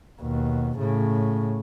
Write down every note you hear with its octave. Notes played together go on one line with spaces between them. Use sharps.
D#2 B2
A2 C#3